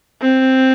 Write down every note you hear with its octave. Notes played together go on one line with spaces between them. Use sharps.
C4